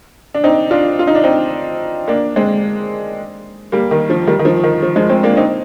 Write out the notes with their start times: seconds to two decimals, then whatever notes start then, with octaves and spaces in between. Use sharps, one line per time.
0.35 D4
0.44 C4 D#4
0.71 D4 F4
0.99 F4
1.07 D#4
1.15 D4
1.24 C4 D#4
2.08 A#3 D4
2.36 G#3 C4
3.72 G3 A#3
3.91 D#3
4.10 F3
4.27 D#3 G3
4.39 D#3
4.45 F3
4.64 D#3
4.83 F3
4.96 F3 G#3
5.09 G#3 C4
5.23 A#3 D4
5.37 C4 D#4